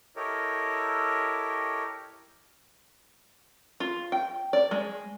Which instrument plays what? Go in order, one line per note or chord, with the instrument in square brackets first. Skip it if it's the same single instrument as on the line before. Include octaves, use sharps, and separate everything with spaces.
[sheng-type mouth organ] E4 G4 A4 A#4 C#5 D#5
[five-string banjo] F4
G5
D5
G#3